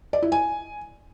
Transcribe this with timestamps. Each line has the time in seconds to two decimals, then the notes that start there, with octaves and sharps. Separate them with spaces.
0.13 D5
0.22 E4
0.32 G#5